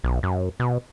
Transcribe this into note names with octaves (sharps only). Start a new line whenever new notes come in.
B1
F#2
B2